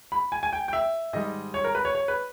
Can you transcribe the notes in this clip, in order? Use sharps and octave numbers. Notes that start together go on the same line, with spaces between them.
B5
G#5
G#5
G5
G5
E5
G#2 D#3 G3 D#5
C#5
A#4
B4
C#5
C#5
B4